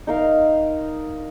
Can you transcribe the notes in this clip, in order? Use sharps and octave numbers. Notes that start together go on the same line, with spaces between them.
D#4 A#4 F5